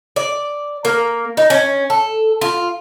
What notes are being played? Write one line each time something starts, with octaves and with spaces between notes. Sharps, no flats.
D5
A#3
D#4
C#4
A4
F4